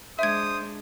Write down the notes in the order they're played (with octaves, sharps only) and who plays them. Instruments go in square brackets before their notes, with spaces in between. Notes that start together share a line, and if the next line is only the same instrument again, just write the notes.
[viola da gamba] G#3 D4 [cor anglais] C5 [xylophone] E5 G#6 [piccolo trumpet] D#6